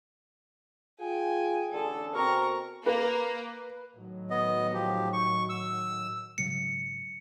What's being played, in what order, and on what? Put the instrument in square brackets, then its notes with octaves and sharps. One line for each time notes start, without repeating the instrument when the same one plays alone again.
[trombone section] F4 G#4 [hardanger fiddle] G5 G#5
[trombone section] A1 D3 G#4 [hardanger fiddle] A4
[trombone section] B2 C4 [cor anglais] A#4 [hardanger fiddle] A#5 C#6
[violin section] A#3 [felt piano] B4
[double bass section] A2 D#3 F#3
[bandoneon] B3 D#5
F3 G4
C#6
E6
[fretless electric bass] G#1 C#3 F#3 [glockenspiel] C#7